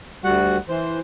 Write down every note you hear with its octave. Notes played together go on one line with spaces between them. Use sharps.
D2 G3 F#4 F#5
E3 C5